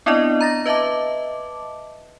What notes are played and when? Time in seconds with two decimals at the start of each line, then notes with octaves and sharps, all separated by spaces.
0.06 B3 C4 D4 E4 D5 D#5
0.41 A#5 A6 A#6
0.66 B4 D#5 E5 A5 D6